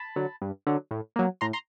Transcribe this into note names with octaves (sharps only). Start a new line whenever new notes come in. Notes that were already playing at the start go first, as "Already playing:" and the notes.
Already playing: A5 B5
D3 F#3
G2
D3 F#3
A2
F#3 A#3
A2 A#5 C6
A#5 C6